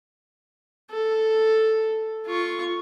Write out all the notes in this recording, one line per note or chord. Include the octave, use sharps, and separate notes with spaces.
A4
F4 C#6